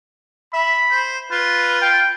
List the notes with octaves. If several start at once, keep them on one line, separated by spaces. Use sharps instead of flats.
E5 B5
C5
F4 B4
G5